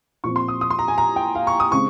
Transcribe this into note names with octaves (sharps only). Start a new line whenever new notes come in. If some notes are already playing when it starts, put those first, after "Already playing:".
A#2 F3 C4 C#6
C6
D#6
D#6
C6
A#5
G#5
A#5
G5
F5
C#6
D#6
C#3 G#3 C4 C#6